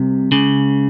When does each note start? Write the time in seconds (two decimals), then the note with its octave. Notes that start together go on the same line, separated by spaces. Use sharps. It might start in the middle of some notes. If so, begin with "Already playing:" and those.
Already playing: C2 C3
0.32 C#2 C#3